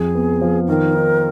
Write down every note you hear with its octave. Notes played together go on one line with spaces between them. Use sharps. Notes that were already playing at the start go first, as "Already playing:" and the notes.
Already playing: F2 G#4
B3
F3
D#3 A#4
D#4